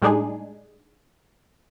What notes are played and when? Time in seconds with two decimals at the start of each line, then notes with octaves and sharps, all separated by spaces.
0.02 A2 G3 G#3 D4 D#4 G#4